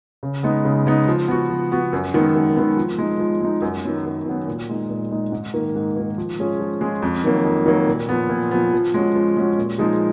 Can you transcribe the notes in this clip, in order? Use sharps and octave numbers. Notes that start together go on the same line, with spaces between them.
C#3
G#3 B3 D#4
C#3
G#3 B3 D#4
F3
B3 F#4
F3
B3 F#4
F#2
D#3 G#3 B3
F#2
D#3 G#3 B3
F3
G#3 D#4
F3
G#3 D#4
F#2
D#3 F#3 B3
F#2
D#3 F#3 B3
A#2
G#3 D#4
A#2
G#3 D#4
G#2
D#3 A#3
G#2
D#3 A#3
F3
G#3 C#4 F4 G#4
F3
G#3 C#4 F4 G#4
F2
D#3 F#3 A#3
F2
D#3 F#3 A#3
A#2
F3 B3
A#2
F3 B3
F3
G#3 C#4 F#4
F3
G#3 C#4 F#4
A#2
F3 G#3 D#4 G#4